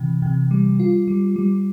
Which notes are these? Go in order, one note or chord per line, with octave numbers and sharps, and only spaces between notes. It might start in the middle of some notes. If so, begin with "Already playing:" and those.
Already playing: C3 E3
C3
G3
F4
G3
G3